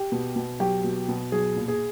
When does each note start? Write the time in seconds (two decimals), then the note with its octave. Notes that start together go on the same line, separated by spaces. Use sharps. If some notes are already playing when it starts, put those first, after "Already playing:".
Already playing: G4
0.12 B2
0.36 B2
0.60 F#3 G4
0.84 B2
1.08 B2
1.32 F#3 G#4
1.56 A#2
1.68 G#4